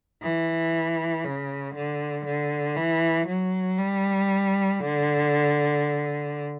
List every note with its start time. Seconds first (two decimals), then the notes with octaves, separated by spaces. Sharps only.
0.22 E3
1.24 C#3
1.75 D3
2.25 D3
2.76 E3
3.27 F#3
3.78 G3
4.80 D3